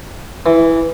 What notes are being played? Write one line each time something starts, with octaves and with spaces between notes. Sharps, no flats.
E3